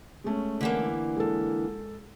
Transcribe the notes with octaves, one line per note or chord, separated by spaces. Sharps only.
G#3 A3 C#4
D3 E3 A#3
G#3 A4